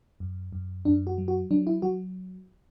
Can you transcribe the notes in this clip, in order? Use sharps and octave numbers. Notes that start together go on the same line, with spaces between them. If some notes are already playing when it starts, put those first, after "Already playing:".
F#2
F#2
F#2 D4
F#4
F#3
F#4
F#3 D4
E4
F#3 F#4